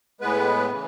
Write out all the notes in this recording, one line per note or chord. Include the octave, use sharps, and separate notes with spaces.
A2 G#3 B3 B4
C#3 E3